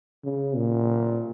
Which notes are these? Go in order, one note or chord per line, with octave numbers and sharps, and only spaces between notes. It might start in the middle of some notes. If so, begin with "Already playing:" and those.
C#3
A#2